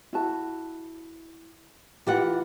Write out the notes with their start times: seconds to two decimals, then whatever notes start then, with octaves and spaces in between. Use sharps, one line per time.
0.13 E4 F#4 A5
2.07 E3 F4 G4 F#5 A#5